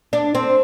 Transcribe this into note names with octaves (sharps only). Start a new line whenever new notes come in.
D4
C4